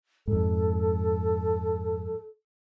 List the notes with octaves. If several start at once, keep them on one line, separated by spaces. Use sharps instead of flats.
F2 G#2 A4